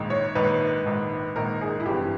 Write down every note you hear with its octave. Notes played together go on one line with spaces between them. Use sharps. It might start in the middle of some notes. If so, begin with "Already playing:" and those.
Already playing: A#1 G#2 D#3
C#5
A#1 G#2 D#3 B4
A#1 G#2 D#3
A#1 G#2 D#3 A#4
G#4
E4
G#1 G2 E3 G4